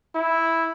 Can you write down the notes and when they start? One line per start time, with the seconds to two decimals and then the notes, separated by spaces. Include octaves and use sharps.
0.15 E4